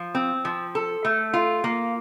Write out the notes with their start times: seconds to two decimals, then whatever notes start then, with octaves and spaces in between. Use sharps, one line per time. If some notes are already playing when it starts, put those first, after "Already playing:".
Already playing: F3
0.15 C4
0.45 F3
0.75 A4
1.05 A3
1.33 F4
1.64 A#3